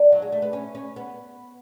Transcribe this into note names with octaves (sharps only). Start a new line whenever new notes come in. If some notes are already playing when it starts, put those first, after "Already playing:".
Already playing: D4
F#3
G#3
A3
B3
C#4
C#4
B3